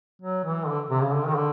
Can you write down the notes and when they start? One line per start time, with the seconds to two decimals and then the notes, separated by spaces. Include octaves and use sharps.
0.22 F#3
0.44 E3
0.68 D3
0.90 C3
1.01 C#3
1.13 D3
1.27 D#3
1.35 D3